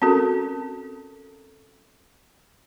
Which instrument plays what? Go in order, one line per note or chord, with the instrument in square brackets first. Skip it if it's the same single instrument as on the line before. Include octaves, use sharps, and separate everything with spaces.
[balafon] C4 C#4 F#4 A4 A#4